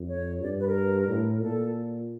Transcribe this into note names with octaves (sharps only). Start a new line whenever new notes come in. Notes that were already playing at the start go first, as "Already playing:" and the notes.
Already playing: F2
C#5
G2 D5
B4
A#4
A2
A#2 A4